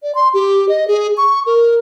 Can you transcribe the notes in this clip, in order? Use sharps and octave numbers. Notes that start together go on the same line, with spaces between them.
D5
C6
G4
D#5
G#4
C#6
A#4